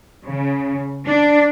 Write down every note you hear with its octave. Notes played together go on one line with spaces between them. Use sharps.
C#3
D4